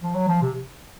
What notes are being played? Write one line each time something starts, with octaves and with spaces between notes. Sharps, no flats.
F3
F#3
F3
C3